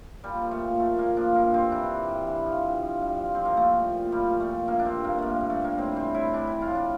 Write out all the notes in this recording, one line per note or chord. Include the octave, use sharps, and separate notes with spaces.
A#2 G3
F3
A3
A#2
A#2 A3
A#2 A#3
F3 D4
G2 A#3
G2 C4
E3 D4
E3
G2
E3
F3
G2
F3
G2
F3
F3 C4
A#3
F3 A3
A#2
A#2
F3 G3
A#2
A3
A#2
G2 A#3
D4
G2 C4
G2 A#3
F3 A3 A#3
G2
A3
G2 A#3
A2 C4
E3 C4
A2 E4
E3 D4
A2 E4
F4
A2 D4